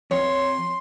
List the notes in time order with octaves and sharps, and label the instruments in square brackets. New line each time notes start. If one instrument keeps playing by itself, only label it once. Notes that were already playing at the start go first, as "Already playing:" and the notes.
[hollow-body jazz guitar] F2 [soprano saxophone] C#5 [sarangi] C6